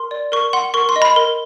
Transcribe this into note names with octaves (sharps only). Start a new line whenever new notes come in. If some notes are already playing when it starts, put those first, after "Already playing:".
Already playing: A#4 C6
D5
A#4 C#6
F#5 C6
A#4 C#6
C6
D#5
B5
A#4